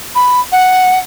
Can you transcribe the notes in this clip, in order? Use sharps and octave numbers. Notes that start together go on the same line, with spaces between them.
B5
F#5